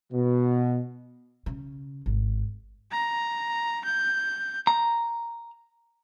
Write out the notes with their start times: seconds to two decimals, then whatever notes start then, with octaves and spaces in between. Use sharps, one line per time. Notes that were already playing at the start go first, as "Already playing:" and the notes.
0.13 B2
1.46 C#3
2.06 G#1
2.92 A#5
3.85 G6
4.67 A#5